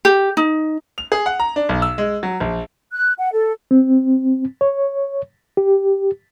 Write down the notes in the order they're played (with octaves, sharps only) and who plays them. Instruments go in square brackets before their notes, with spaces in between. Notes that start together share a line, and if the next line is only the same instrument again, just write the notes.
[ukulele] G4
D#4
[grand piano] F7
G#4
F#5
A#5
D4
B1
E6
G#3
F#3
A#1
[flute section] F#6
F#5
A4
[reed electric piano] C4
C#5
G4